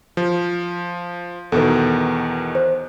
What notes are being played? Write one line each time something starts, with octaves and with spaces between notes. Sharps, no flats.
F3
E2 B2 D#3 A4 B4
C5